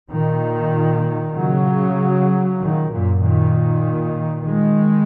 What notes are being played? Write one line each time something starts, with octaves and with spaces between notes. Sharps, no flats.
A#2 D#3
C#3 F#3
A#2 D#3
F#2 A#2
A#2 D#3
D#3 G#3